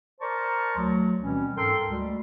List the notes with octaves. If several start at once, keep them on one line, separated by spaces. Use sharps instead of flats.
A#4 C5 D5 A5 A#5 C#6
D2 F#3
B2 E3 G3 C4 C#4
G#2 A4 A#4 G5 C6
D2 G3 G#3